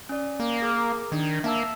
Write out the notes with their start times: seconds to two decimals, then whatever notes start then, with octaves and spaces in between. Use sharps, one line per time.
0.09 C#4 D5
0.40 A#3
0.62 G#4 A#4 D6
1.12 D#3 D4
1.44 A#3 E5 A5 E6